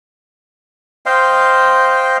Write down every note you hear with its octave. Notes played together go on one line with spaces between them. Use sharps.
C5 D#5 F5 G5